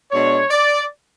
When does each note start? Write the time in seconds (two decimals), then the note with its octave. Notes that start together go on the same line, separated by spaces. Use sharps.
0.12 B2 G#3 D4 C#5
0.50 D5